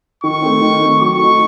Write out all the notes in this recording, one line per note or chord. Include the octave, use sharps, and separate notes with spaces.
D#3 C#6
A3 C4
D#3
A3 C4
F#3 C#6
A3 D#4